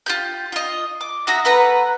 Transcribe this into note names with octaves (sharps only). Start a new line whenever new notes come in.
F4 G4 G6
F4 D#5
D6
D#4 F#4 E5 A#5
A3 B4 F#5 A#5